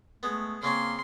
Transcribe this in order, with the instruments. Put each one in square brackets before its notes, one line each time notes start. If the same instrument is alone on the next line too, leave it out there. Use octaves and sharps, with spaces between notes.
[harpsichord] G#3 B3 [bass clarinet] A3
[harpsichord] C#3 C4 C#4 [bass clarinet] A#3 [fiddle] C6